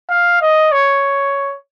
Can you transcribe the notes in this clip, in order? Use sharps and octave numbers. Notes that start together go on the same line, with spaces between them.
F5
D#5
C#5